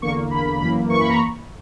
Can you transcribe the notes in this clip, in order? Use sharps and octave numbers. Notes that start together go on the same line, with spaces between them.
E2 D3 A#3 C#6
E2 D3 A#3 B5
F#2 E3 A#3 B5
F#2 E3 A#3 C#6
B5
A#5